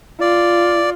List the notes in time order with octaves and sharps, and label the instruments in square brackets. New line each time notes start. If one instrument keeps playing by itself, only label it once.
[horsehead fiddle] F4 [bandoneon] D5